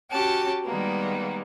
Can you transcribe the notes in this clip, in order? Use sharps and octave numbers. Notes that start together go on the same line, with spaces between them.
C#4 F#4 G4 A5
D#3 G3 G#3 A#3 B3